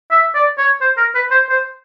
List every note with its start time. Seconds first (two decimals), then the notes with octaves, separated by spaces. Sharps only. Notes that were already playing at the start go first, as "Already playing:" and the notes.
0.11 E5
0.34 D5
0.58 C#5
0.81 C5
0.97 A#4
1.15 B4
1.31 C5
1.49 C5